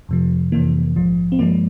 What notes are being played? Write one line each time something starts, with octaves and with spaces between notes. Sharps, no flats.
F2 C3 F3
F2 C3 E3 A#3
A#1 G#2 F3
C4
G2 F3 G#3 A#3